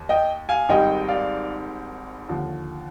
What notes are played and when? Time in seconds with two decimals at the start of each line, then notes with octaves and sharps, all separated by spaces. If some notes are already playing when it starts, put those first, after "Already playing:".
Already playing: D#2
0.09 D#5 G5
0.49 F5 G#5
0.69 G#1 G#2 D#3 G3 D#5 G5
1.09 D5 F5
2.29 D#2 D3 F3